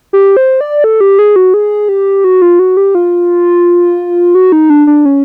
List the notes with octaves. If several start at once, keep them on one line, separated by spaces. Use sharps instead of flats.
G4
C5
D5
A4
G4
G#4
F#4
G#4
G4
F#4
F4
F#4
G4
F4
F#4
D#4
D4
D4
C#4